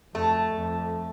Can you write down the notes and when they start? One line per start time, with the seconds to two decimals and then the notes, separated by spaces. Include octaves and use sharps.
0.14 F2 A3
0.53 F2